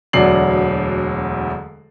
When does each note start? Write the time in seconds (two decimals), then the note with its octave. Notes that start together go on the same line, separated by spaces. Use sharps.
0.13 E1 D2 F#3 D5 C7 F#7